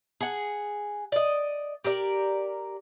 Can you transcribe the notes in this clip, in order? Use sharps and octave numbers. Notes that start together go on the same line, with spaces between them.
G#4 F#5
D5 D#5
G4 A#4 D5